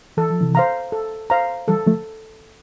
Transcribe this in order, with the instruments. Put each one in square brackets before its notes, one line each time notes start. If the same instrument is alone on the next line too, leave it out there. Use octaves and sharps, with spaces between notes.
[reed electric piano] E3 [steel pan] A4
[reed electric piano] F3
C3 E3
[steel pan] C5 F5 A#5
A4
C5 F5 A#5
[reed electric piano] E3 G3 [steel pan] A4
[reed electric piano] F3 A3